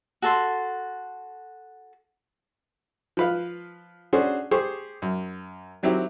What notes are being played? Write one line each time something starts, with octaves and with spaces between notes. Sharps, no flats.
F#4 A4 C6
F3 B4 F5
C#4 D4 F#4 G#4 C5
G4 G#4 C5 C#6
F#2
D#3 F#3 C4 E4 G4